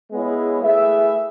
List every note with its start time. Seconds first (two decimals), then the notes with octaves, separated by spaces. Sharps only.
0.11 G#3 B3 E4 G#4 C#5
0.62 A3 E4 G#4 B4 E5